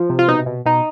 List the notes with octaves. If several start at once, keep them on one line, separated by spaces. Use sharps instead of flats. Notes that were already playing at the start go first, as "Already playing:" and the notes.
Already playing: F3
C3
F4
B2 D#4
B2
B2 D#4